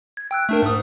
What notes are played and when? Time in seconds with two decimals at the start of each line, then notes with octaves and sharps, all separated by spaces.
0.17 G#6
0.31 G5 E6 F#6
0.49 A3 D4 A#4
0.62 G#2 D#6